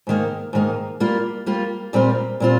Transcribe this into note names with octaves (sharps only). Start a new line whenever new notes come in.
G#2 D#3 A#3
G#2 D#3 A#3
G3 A#3 F4
G3 A#3 F4
A#2 G3 C4 F4 A#4
A#2 G3 C4 F4